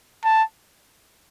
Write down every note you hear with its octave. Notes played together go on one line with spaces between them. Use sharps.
A5